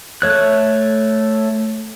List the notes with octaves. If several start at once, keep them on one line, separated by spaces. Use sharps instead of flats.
A3 C#5 F#6